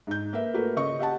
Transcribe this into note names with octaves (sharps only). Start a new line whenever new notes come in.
G#2 G6
A#3 A#4 B4 E5
A3 A#3 F#4 A#4 B4
C#3 D#5 C#6
G4 D#5 F#5 A5